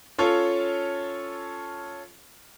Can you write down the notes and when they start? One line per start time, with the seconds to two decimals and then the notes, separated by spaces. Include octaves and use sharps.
0.18 C#4 F4 A4 C#5